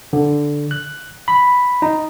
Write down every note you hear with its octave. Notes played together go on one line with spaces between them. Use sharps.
D3
F#6
B5
D#4